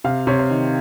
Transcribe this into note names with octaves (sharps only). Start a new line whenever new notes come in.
C3 F5
C3 C#5
C5
D#3